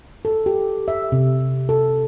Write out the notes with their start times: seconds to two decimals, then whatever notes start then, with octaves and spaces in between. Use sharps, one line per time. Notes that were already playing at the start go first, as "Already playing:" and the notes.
0.25 A4
0.46 G4
0.88 E5
1.12 C3
1.69 A4